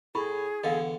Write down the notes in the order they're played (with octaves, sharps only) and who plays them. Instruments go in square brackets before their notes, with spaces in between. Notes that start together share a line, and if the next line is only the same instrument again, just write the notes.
[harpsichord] A2 [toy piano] E4 B5 C#6 [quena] G#4
[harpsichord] E2 D3 [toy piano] D#5 F5 G5